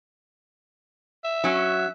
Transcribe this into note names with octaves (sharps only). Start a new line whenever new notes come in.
E5
F#3 C#4